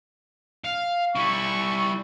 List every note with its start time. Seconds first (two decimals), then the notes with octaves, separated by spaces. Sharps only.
0.65 F5
1.16 G3 E4 C#6